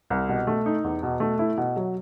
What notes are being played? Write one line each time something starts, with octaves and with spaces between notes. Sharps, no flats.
C2
B2
A3
D#4
E2
B2
A3
E4
B2
F#3